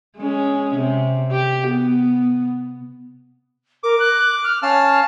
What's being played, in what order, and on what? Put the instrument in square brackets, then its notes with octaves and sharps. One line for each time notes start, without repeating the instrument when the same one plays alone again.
[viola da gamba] G#3 C#4
C3
G4
B3
[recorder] A#4 [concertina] D6
[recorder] F#6
F6
[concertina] C#4 A5 F6 [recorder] F5